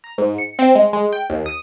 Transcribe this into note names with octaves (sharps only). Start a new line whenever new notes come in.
A#5
G#2
C#7
C4
G#3
G#3
G5
D#2
D#6